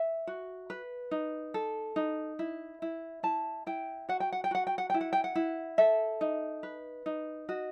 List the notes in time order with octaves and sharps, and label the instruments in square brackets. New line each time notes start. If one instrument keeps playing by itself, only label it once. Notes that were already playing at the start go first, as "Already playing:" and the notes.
Already playing: [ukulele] E5
F#4
B4
D#4
A4
D#4
E4
E4
E4 A5
E4 G5
F#4 F#5
G5
F#5
G5
F#4 F#5
G5
F#5
E4 G5
F#5
G5
F#5
E4
A4 E5
D#4
B4
D#4
F#4 D#5